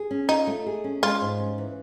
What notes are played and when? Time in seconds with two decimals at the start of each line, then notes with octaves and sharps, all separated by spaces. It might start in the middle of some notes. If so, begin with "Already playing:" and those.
Already playing: G#4
0.11 C#4
0.29 D#4 F4
0.47 A3
0.66 G#4
0.84 C#4
1.03 G#3 F4
1.21 G#2
1.40 C#4
1.58 E3